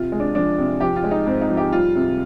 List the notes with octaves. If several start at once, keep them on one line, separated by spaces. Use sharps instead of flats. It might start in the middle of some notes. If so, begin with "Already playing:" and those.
Already playing: C3 F4
G#3
D4
F3 D4
C3
F3 G4
F4
G#3
D#4
G#2 C4
D#4
F3
G4
G3 F4
C3